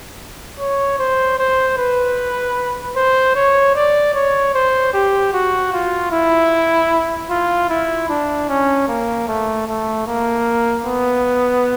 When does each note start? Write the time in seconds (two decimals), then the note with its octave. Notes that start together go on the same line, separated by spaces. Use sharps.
0.59 C#5
0.99 C5
1.39 C5
1.78 B4
2.96 C5
3.35 C#5
3.75 D5
4.14 C#5
4.54 C5
4.93 G4
5.33 F#4
5.72 F4
6.12 E4
7.30 F4
7.70 E4
8.09 D4
8.49 C#4
8.88 A#3
9.28 A3
9.68 A3
10.07 A#3
10.85 B3